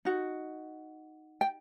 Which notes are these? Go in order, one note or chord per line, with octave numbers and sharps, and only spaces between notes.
D#4 F#4
G5